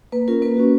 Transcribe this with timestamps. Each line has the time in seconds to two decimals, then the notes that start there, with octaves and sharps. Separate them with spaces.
0.12 A#3 B4
0.28 C#4 F4 A#4
0.42 A#3 B4
0.57 C#4 F#4